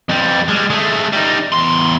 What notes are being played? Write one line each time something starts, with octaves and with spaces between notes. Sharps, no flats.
F2 G3
G3 G#3
G#3 A3
G3 D#4
E2 C6